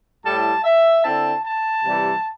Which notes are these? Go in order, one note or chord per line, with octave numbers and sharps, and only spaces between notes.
A2 G3 E4 A5
E5
D3 C4 E4 A5
A5
C3 E3 G3